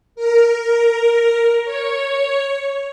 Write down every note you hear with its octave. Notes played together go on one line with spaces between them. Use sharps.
A#4
C#5